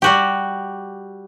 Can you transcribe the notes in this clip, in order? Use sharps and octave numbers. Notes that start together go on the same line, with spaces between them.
G3 F#4 G4